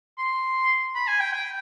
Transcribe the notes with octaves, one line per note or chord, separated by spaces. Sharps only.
C6
B5
G#5
G5
G5